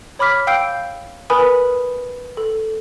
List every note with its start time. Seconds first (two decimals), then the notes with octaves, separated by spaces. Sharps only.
0.19 C#5 B5 D6 F6 B6
0.47 F5 G5 E6 G6 C7 D7
1.30 A#4 B4 G#5 B5 D#6
2.37 A4